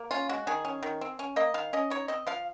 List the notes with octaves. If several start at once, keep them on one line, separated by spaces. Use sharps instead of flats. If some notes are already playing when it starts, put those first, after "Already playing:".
Already playing: A#3
C#4 F4
G#3 F#4
D#3 G#4
C#4
D#3
C4
C#4
A#3 D#5
D#3 F5
C#4 D#5
D#4 C#5
C4 D#5
F3 F5